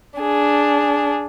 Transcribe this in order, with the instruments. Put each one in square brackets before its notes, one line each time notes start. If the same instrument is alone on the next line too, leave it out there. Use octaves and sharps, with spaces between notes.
[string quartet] D4 G#4